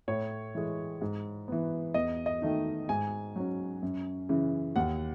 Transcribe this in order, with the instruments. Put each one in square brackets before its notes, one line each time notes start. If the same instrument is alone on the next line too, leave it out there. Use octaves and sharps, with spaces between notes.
[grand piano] A2 C#5
E3 G#3
G#2
E3 B3
E2 D#5
D#5
D#3 A3 D#4
G#2 G#5
F#3 C#4
F#2
C#3 E3
D#2 F#5